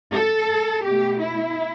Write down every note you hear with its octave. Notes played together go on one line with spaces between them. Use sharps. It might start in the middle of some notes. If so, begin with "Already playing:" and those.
A4
B2 A3 G4
E4